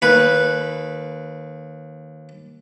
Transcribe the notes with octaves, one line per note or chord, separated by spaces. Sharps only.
D#2 B4